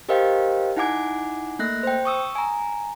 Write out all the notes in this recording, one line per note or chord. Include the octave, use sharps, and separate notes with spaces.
G4 A#4 C5 D#5 F5 G5
D#4 E4 F#5 G#5 D6 G#6
A3 A#3 F#6 A#6
C5 G5
C#6 D#6 E6
G#5 A#5